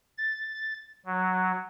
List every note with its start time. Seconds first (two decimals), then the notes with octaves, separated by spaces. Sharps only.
0.18 A6
1.06 F#3